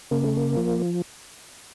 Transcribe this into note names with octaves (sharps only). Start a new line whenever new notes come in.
C#3 A#3
A3
A#3
F3